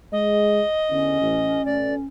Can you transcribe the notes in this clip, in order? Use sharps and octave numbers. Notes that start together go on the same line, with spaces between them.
G#3 D#5
E2 D3 C#4
A1
B2 A3 D5